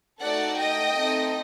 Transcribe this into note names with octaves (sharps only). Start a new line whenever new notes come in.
A3 D#4 F#4 A4 D5 F#5
D#5 G5
A3 C4 D#4 A4